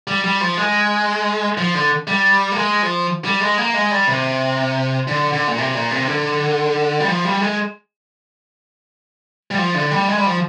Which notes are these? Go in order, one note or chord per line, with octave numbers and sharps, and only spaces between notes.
G3
G3
F3
G#3
F3
D3
G3
A#3
G#3
F3
G3
G#3
A#3
G#3
G3
C3
D3
D3
A#2
C3
A#2
C3
D3
G3
F3
G3
G#3
G3
F3
D3
G3
G#3
G3
F3